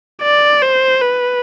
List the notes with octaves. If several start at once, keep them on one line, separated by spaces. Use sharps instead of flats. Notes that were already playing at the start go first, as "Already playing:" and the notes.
D5
C5
B4